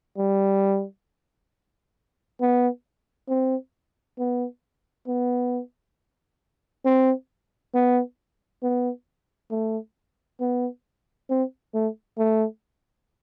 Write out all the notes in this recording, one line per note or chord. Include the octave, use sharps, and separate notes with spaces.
G3
B3
C4
B3
B3
C4
B3
B3
A3
B3
C4
A3
A3